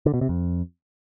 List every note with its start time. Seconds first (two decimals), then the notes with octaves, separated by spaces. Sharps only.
0.06 D3
0.14 B2
0.21 C3
0.29 F2